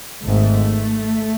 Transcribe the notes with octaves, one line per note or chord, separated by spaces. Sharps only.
G#1 G#2 A3